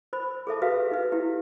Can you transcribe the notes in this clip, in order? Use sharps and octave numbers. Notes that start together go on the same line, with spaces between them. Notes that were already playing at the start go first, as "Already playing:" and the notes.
C5 B5
G#4 A4 E5 A5
F#4 G4 B4 E5 F5
D#4 B4
E4 G4